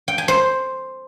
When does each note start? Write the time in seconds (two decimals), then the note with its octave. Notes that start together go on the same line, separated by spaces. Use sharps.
0.08 G5
0.18 G#5
0.28 C5